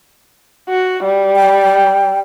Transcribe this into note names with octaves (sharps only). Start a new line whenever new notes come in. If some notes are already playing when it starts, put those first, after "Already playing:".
F#4
G3
G5